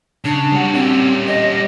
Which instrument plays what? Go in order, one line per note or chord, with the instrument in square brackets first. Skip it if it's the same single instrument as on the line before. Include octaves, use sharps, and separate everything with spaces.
[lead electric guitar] C#3 [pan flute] D4
[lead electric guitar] G3 F#4
[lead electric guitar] G3 C#4 [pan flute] C4
[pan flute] D#5